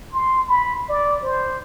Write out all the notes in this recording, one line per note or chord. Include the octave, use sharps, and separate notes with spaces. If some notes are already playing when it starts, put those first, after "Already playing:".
C6
B5
D5
C5